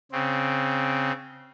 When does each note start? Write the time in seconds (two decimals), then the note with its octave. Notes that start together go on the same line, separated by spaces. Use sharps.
0.12 C#3 C4